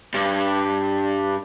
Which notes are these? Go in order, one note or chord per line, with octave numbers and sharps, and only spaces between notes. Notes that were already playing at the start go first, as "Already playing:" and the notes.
G2